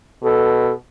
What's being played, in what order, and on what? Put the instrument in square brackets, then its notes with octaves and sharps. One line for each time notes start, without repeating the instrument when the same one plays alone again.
[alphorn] B2 [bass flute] A4